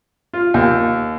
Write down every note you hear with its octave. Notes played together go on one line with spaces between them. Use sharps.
F4
D#2